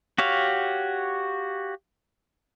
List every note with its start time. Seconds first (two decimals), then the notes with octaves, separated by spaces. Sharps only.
0.18 F#4 G4 C#5 F5